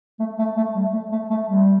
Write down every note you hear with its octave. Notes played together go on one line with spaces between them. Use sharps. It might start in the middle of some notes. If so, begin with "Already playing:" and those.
A3
A3
A3
G3
A3
A3
A3
G3